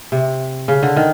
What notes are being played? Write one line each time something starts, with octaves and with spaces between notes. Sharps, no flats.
C3
C#3
D3
D#3